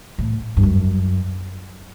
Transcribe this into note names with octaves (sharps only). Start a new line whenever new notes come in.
A2
G2
F#2